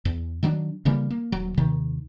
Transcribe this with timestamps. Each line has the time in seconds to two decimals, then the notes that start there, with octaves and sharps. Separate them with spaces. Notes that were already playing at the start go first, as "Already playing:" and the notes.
0.05 E2
0.43 D#3 F#3 B3 D4
0.85 C#3 E3 G3 A#3
1.10 A#3
1.32 D#1 F#3
1.58 D#2 C3 D#3